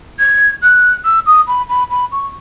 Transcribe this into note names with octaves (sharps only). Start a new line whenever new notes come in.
G#6
F#6
E6
D#6
B5
B5
B5
C#6